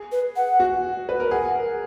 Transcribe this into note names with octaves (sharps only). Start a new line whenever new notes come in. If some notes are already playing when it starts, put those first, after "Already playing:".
Already playing: G#4
B4
F#5
F#4
B4
A#4
G#4 F#5
A#4